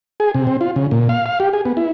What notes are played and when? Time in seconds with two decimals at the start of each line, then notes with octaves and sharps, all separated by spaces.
0.20 G#4
0.34 C3
0.47 C4
0.61 F4
0.76 C#3
0.91 A#2
1.09 F5
1.26 F5
1.40 G4
1.53 G#4
1.65 B3
1.77 E4